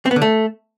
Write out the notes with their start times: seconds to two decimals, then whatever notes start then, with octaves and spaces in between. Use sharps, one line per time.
0.06 C4
0.11 B3
0.16 D3
0.22 A3